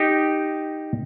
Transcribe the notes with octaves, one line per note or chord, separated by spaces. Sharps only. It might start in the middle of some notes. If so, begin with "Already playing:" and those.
Already playing: D#4 G4